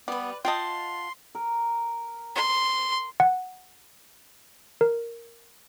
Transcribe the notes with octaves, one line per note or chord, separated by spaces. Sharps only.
G3 B3 B4 D5
F4 D#5 F#5 G5 A5 C6
A#4
C6
F#5
A#4